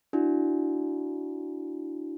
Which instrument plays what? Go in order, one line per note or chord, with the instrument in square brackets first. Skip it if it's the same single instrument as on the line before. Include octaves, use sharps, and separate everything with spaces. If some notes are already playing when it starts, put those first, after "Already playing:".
[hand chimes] D4 E4 F#4